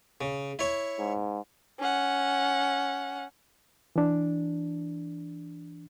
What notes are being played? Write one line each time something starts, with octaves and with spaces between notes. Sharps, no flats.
C#3
E4 C#5 C#6
G#2
C#4 F#5
E3 D4